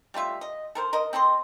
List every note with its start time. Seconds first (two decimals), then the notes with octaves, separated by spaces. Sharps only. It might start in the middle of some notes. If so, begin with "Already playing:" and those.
0.14 G3 A3 F4 E5
0.41 D#5
0.75 A4 A#4 C5
0.93 A#4 C5 D#5
1.13 C4 A4 D#5 C6